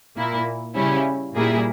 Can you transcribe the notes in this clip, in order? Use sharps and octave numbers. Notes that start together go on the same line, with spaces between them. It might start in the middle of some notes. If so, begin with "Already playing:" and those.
A#2 A#3 E4
C#3 G3 C#4 E4
A#2 G3 A#3 E4 G#4